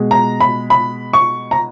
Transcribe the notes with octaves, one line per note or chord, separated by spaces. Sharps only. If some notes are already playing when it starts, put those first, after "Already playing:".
Already playing: B2 G#3
A#5
B5
B5
C#6
A#5